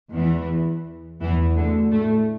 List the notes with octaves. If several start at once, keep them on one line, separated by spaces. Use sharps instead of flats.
E2 E3
E2 E3
D2 D3
A2 A3